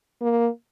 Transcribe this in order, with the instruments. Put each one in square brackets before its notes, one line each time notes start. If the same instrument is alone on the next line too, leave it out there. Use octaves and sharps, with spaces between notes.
[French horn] A#3